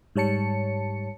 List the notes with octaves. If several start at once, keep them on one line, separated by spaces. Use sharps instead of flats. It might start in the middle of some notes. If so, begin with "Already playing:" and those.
G#2 G3 C#5 A5 C#7